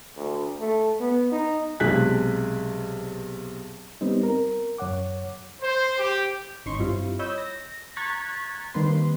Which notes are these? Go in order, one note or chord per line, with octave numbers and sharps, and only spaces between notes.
D2
A3
B3
D#4
B1 C3 G#3 G#4 F#6 B6
G3 B3 C4 D#4
A#4
F#2 C#5 F#5 D6
C5
G4
G#1 C#4 D#4 C6 C#6
G2 G3 C4 E4 F4
C#5 D#5 B5 E6 G6
A#6
A#5 C#6 F#6 G#6 A6 B6
D#3 G3 A#3 C4 B4 C6